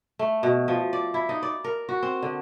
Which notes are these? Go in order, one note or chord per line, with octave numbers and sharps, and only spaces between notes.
A3
B2
F3
D5
E4
D#4
D5
A#4
F#4
C4
D3